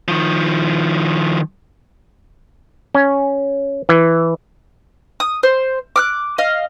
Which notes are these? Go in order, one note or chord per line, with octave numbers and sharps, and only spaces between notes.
D#3 F3
C#4
E3
D#6
C5
D6 F6 F#6
D#5 F5